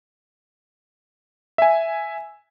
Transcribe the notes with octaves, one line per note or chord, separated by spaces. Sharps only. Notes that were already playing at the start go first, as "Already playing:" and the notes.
E5 G#5